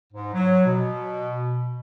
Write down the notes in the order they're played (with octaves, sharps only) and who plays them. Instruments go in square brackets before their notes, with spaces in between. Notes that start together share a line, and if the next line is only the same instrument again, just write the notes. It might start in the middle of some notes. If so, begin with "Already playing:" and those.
[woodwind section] G#2
F#3
B2